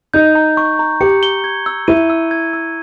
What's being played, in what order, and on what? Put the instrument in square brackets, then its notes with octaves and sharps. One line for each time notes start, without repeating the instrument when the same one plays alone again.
[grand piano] D#4 [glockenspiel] G6
[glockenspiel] A#5
C#6
A#5
[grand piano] G4 [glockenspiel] C#7
[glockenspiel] G7
G#6
E6
[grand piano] E4 [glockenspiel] D#7
[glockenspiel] E6
G#6
E6